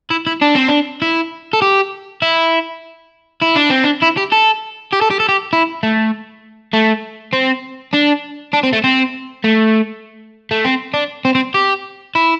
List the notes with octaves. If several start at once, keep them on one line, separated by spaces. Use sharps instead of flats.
E4
E4
D4
C4
D4
E4
A4
G4
E4
E4
D4
C4
D4
E4
G4
A4
G4
A4
G4
A4
G4
E4
A3
A3
C4
D4
D4
C4
A3
C4
A3
A3
C4
D4
C4
C4
G4
E4